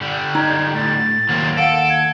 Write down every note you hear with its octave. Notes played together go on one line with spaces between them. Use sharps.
D3 G3
D#4 D5 D#5 A#5 G#6
A2 A6
D#2 F#3 A#3 C4
A4 F5 F#5 D7
G#6